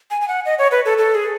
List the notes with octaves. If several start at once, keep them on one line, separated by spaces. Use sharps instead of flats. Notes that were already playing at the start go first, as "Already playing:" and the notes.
G#5
G#5
F#5
D#5
C#5
B4
A4
A4
G#4